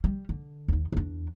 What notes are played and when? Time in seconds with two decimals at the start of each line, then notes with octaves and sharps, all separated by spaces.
0.04 G3
0.29 D3
0.68 D#2 D#4
0.92 E2 D4